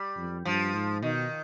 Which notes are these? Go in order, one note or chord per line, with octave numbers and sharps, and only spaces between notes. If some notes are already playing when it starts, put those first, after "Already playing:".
Already playing: G3
F2
G2 F3
G#2
B2 D#3